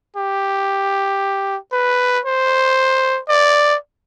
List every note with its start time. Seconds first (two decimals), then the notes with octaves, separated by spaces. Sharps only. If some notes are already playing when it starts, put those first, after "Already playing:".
0.16 G4
1.73 B4
2.25 C5
3.29 D5